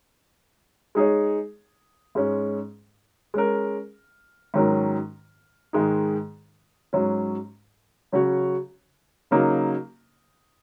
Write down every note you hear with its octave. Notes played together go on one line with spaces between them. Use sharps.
G#3 D#4 G#4 C#5
G#2 G#3 C#4
G#3 C#4 A#4
G#2 D#3 F#3 C#4 A#4
G#2 D#3 G#3 D#4
G#2 F#3 C#4
C#3 F#3 C#4 F#4 C#5
C#3 F#3 A#3 D#4